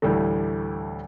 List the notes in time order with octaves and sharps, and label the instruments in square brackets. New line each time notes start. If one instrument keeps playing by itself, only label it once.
[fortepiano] D2 A2 E3 G3 A3